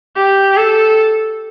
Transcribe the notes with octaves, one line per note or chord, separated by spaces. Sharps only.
G4
A4